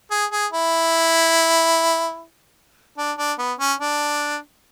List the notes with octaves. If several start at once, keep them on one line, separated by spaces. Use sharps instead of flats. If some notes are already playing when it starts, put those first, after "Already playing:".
G#4
G#4
E4
D4
D4
B3
C#4
D4